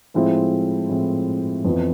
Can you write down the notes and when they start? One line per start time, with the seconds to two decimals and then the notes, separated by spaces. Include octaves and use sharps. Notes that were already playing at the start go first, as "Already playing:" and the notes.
0.14 A2 F3 G#3 C4 E4
0.89 A2 F3 G#3 C4 E4
1.65 F2 E3 B3 F4